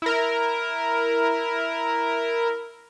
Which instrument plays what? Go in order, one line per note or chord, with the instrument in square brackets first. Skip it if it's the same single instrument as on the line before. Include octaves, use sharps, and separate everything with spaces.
[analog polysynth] E4 A#4